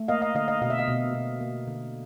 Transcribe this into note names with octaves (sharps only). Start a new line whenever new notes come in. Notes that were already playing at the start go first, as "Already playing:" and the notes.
Already playing: A3
A#3 D#5 F5
D#5 F5
D3 D#5 F5
D#5 F5
B2 F5
E5
D#5 F5
B2
B2
A#3
D3